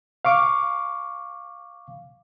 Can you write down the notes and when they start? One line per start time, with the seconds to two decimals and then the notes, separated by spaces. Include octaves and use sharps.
0.25 F5 C#6 D6